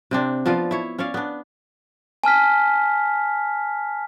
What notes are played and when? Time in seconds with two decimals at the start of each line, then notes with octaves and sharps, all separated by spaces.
0.11 C3 C4 D4
0.46 F3 B3 F4 D5
0.71 E4 C#5
0.98 C#4 C#5 D5 F5
1.14 B3 D4
2.24 G#5 A5 F6 B6